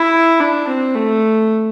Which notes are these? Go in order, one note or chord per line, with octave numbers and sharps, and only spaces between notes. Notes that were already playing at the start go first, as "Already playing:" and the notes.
Already playing: E4
D4
C4
A3